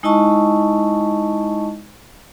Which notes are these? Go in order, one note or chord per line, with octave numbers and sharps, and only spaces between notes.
G#3 D#4 E4 D#5 A5 C#6